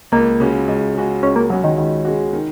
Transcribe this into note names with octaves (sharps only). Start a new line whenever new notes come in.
C#2 A#3
C#3 G#3 C#4 F#4
C#2
C#3 G#3 C#4 F#4
C#2 C#4
A#3
C#3 F#3 G#3 C#4 F#4
D#3
C#2 D#3
C#3 G#3 C#4 F#4
D#3